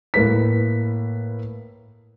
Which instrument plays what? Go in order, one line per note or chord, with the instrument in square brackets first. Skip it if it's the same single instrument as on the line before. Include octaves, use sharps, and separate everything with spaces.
[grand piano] A2 A#3 B4 B6